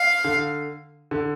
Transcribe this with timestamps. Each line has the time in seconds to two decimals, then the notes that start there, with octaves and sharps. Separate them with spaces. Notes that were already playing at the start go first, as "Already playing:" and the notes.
Already playing: F5
0.24 D3
1.11 D3